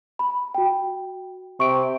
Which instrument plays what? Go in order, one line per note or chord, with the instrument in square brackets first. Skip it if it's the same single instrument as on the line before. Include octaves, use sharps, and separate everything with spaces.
[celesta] B5
F#4 G5
[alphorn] C3 [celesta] C#6 D7